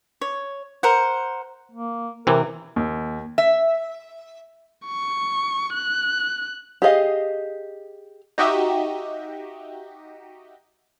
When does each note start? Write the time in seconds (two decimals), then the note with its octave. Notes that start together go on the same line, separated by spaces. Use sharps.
0.21 C#5
0.83 A#4 C5 F#5
1.72 A#3
2.27 C3 E3 A#4
2.76 D#2
3.38 E5
4.86 C#6
5.74 F#6
6.82 G4 G#4 D#5 F5
8.38 D#4 F#4 G4 D#5 E5